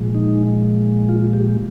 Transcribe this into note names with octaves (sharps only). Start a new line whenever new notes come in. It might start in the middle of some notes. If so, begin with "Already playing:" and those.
Already playing: A#2 F3 G#3
D#4
F4
G4